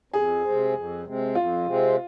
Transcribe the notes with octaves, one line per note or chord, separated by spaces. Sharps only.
F2 G#4
C3 G#3 C4
F2
C3 G#3 C4
F2 F4
C3 G#3 C4